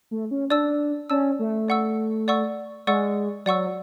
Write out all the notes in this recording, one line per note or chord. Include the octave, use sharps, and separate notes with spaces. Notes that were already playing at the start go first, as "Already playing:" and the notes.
A3
C#4
D4 D5 A5 E6
C#4 D5 A5 E6
A3
D5 F#5 C#6 E6
D5 F#5 C#6 E6
G#3 D5 F#5 C#6 E6
F#3 D5 F#5 C#6 E6